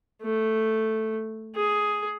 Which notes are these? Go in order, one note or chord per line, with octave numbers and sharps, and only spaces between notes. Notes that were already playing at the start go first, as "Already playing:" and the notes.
A3
G#4